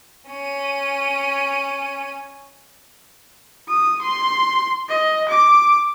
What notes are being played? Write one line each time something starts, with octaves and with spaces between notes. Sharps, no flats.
C#4 D#7
D#6
C6
D#5
D6